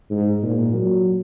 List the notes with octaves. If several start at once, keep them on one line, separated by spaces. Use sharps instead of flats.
G#2
A#2
F#3